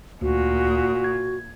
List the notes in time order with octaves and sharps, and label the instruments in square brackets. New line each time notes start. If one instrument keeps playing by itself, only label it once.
[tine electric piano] D2 [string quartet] A#2 [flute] F#4
[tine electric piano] G#6